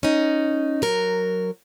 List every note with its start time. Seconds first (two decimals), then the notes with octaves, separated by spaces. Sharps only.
0.03 C#4 D#4
0.82 F#3 A#4